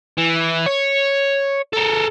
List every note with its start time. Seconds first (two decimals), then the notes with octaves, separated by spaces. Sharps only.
0.18 E3
0.66 C#5
1.73 A4 A#4